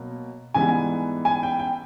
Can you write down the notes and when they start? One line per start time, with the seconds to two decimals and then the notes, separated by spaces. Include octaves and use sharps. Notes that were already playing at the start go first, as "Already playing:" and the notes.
Already playing: B2 F#3 A#3
0.54 G#2 E3 G3 B3 G#5
1.25 G#5
1.43 G5
1.59 G5